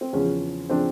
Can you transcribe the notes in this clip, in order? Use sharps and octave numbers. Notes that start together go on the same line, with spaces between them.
C4
E2 C#3 F3 C#4
C#3 F3 C4 D4